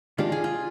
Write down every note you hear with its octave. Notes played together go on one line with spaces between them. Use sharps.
D#3 G#3 D4 F4 G4 D5
G#4
F4